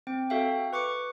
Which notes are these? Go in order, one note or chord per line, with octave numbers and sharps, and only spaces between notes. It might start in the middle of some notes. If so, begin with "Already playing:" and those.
C4 G5
F#4 A4 E5 F5 G5
B4 C#6 D6 C#7